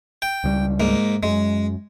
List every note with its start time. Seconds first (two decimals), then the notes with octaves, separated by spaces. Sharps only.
0.22 G5
0.44 C#2 F3 G3
0.80 G#2 A#3
1.23 F#2 G#3